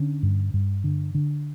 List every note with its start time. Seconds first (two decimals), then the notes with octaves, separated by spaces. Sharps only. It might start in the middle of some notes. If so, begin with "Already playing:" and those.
Already playing: D3 C#4
0.23 G2
0.54 G2
0.84 D3
1.15 D3